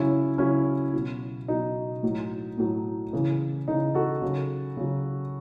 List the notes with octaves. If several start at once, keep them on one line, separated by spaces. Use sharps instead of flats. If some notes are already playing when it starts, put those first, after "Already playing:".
Already playing: C#3 F#3 C#4 E4
C#3 F#3 C#4 E4
B2 F#3
B2 F#3 D#4
A2 F#3
A2 F#3
C#3 E3
C#3 E3 D#4
F#4 A4
C#3 F#3
C#3 F#3